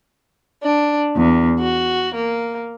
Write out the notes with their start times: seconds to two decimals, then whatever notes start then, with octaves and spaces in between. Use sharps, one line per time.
0.63 D4
1.16 E2
1.60 F#4
2.14 A#3